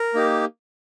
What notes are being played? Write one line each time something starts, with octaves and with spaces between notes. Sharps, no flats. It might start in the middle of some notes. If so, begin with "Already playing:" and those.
Already playing: A#4
A#3 D#4 G4